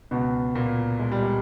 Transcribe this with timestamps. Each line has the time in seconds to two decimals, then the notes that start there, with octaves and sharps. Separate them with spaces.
0.11 C#2 B2 B3
0.55 A#2 A#3
0.99 G#3
1.12 G3
1.23 G#3